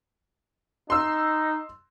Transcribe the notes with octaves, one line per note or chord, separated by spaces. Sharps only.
D#4 C6 E6